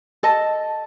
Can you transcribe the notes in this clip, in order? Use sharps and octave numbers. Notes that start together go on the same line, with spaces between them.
A4 D#5 A5